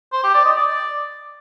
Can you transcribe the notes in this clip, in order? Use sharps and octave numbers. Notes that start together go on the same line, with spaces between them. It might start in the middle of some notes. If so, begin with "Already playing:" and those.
C5
G4
D5
D#5
D5